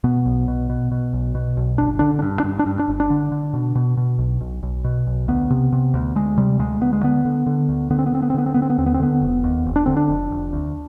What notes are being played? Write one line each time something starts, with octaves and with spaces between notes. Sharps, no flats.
B2 B3
B1
B2
B2
B2
B1
B2
B1
G1 D4
D3 D4
D4
G2
D4
G2
D4
G2
D4
G1
D4
D3
D3
B2
B2
B2
B1
B1
B1
B2
B1
D2 B3
C3
C3
D2
D2 G#3
C3 G3
D2 G#3
D2 B3
G#3
D3 B3
D3
D3
D2
D3 B3
C4
B3
D3 C4
B3
C4
D3 B3
C4
D3 B3
C4
B3
D#2 C4
B3
C4
D3 B3
F1
D#2
F1
D4
D3 C4
D4
F1
F1
D2